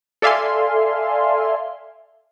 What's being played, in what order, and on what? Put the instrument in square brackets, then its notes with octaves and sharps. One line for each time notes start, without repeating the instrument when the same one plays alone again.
[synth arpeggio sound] A4 D5 E5 F5 G#5 C6